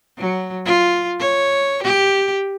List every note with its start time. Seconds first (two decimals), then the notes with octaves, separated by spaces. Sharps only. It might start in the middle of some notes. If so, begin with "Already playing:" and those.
0.18 F#3
0.66 F4
1.20 C#5
1.83 G4